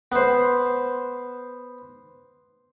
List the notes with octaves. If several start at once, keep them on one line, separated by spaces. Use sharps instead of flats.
B3 C5